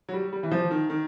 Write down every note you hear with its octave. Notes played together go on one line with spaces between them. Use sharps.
F#3
G3
G3
E3
F3
D#3
D#3